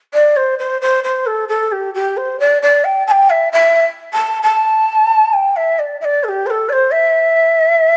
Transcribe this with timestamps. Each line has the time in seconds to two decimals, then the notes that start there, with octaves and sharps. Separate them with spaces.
0.14 D5
0.37 C5
0.59 C5
0.81 C5
1.04 C5
1.26 A4
1.49 A4
1.72 G4
1.95 G4
2.17 C5
2.40 D5
2.62 D5
2.84 G5
3.07 A5
3.11 G5
3.30 E5
3.53 E5
4.13 A5
4.43 A5
5.33 G5
5.56 E5
5.79 D5
6.01 E5
6.05 D5
6.24 A4
6.29 G4
6.46 C5
6.50 A4
6.69 D5
6.73 C5
6.91 E5